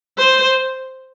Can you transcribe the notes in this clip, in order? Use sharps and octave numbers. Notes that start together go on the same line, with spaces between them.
C5